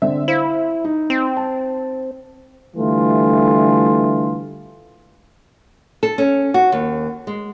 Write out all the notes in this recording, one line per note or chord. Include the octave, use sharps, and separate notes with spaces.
D3 C4 E5
E4 C5 F5
D#4
C4
A5
D3 E3 G3 A3 F4
A4
C#4
F#4
D#2
G#3